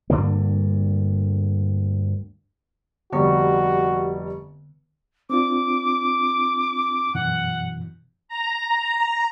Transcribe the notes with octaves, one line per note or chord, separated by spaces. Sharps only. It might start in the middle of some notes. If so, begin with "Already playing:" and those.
D2 G2 D3 A#3
F1 D3 G3 B3 F#4 C#6
C4 D4 F4 D6
F#2 B2 E3 F#5
A#5